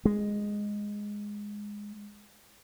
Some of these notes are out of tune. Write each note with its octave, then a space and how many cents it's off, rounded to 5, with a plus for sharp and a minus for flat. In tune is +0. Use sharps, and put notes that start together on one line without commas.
G#3 -5